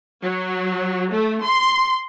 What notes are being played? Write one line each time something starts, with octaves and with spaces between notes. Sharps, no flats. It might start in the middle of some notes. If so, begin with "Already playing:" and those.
F#3
A3
C6